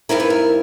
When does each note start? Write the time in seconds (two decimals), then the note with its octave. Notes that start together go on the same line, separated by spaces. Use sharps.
0.09 G2 D#3 G3 C4 E4 A#4
0.20 B4
0.30 A#4